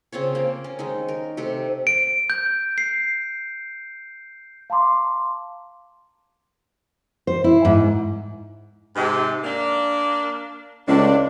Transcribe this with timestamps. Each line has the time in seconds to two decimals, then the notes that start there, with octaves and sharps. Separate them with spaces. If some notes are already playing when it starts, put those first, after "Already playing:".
0.12 C#3 C4 F4 C#5
0.35 A#3 C4
0.64 C#4
0.79 D#3 G#3 D#4
1.08 A#4
1.37 C3 A3 G4 C5
1.87 D7
2.30 G6
2.78 C7
4.70 F5 A5 A#5 C6 D6
7.27 C5
7.44 E4
7.65 G#2
8.96 G#2 C3
9.44 A#3 D4
10.88 C#2 A2 D4